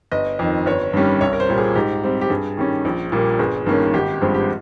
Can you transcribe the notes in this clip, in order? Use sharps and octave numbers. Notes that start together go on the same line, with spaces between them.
G1 D#5
F2 D#3
G1 C#5
G2 D#3 G3 C#4
C2 C#5
A#4
C5
A#2 G3 A#3
G#4
G#2 G4
G3 C4
G4
G2 G#4
D#3 G3 C#4
A#1
A#2 G3 A#3
G1 G#4
G2 D#3 A#3 C#4
G#1 G4
G2 F3 G#3 C4
G4